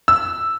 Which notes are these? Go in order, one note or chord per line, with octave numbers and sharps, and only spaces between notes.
E6